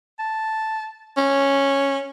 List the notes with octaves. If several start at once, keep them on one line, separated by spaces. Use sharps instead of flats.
A5
C#4